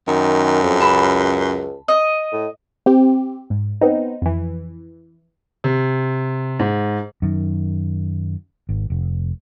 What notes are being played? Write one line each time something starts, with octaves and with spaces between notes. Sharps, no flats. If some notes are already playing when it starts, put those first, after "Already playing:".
F#2 D#3
F2
C#2 A5 B5
D#5
A2
C4 G4
G#2
B3 C4 D#4
F2 E3
C3
G#2
F#2 D#3
G#1
F1